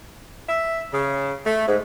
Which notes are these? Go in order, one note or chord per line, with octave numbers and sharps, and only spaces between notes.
E5
C#3
A3
G#2